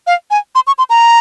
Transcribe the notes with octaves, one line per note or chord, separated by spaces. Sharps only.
F5
G#5
C6
C#6
C6
A#5